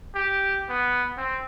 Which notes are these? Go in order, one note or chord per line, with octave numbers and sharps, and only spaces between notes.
G4
B3
C4